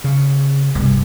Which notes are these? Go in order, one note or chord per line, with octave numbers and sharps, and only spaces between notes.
C#3
G2 C3